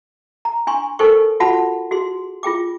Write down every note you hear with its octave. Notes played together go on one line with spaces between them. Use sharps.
A#5
D4 G#5 C6 C#6
D#4 A4 A#4 C5 G5 C#6
F4 F#4 F#5 A5 B5
F#4 G#4 C6
F4 G#4 G5 D6